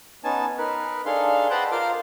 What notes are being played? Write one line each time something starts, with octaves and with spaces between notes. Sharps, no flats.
B3 C#4 D#4 G#5 A5
D#4 A#4 B4
D4 D#4 G#4 A4 F5 C6
B4 C5 D#5 F#5 G5 A5
F4 A#4 C5 F5 C6 D6